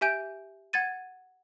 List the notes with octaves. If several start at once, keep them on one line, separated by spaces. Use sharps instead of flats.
G4 E5 G#5 G6 D7
F#5 G#6 A6 D#7